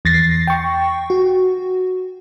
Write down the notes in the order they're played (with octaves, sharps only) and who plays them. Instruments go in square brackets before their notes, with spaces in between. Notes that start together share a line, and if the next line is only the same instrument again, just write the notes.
[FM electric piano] E2 A6 A#6 C7
G5 C#6
F#4